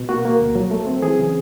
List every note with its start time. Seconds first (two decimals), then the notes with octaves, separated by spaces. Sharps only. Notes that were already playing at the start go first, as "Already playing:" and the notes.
Already playing: B2
0.09 A#3 F#4
0.25 A#3
0.40 D2
0.55 F#3
0.71 A3
0.86 C4
1.02 E3 G#4
1.19 C#3